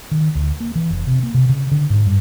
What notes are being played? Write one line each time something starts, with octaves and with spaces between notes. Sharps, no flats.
D#3
D2
A#3
E3
F1
C3
A#3
C3
C#3
D3
G#2
G2